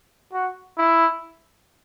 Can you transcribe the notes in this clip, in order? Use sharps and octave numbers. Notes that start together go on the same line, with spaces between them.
F#4
E4